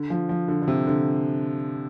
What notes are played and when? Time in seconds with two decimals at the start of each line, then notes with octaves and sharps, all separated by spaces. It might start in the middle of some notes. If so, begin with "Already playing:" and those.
Already playing: D3
0.10 F3
0.29 F3
0.48 D3
0.62 D3
0.68 C3
0.87 D3